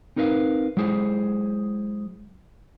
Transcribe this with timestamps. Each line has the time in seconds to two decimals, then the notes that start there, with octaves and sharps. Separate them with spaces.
0.16 C4 D#4 A#4 B4 D#5 F5
0.77 F#3 G#3 E4 G#4 C5